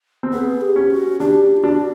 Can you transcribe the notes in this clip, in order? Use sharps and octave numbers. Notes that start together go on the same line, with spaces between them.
C4
B3 G#4
G4
C#4
F#4
D4 G4
F4
D4 F#4